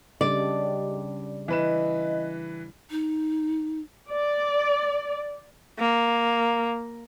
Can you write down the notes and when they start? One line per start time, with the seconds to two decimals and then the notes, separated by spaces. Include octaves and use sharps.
0.21 C#3 G3 C#4 D4 G4 D5 D#5
1.48 E3 B4 D#5 E7
2.90 D#4
4.12 D5
5.79 A#3